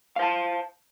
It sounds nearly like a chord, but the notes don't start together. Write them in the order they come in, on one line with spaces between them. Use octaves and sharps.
F5 C5 A5